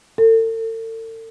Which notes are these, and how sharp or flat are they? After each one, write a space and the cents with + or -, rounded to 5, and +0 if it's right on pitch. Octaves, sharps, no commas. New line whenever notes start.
A4 +40